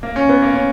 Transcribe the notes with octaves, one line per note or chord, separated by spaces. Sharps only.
A#3
C#4
B3
A#3
C#4